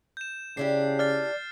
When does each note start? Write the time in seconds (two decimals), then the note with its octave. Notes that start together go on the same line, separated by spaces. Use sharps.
0.17 G6 E7
0.57 C#3 D4 E4 G4 C7
0.99 D5 F6 A6 C7